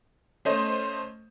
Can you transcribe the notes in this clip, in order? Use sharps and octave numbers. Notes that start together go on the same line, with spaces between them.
A3 C#4 C5 D#5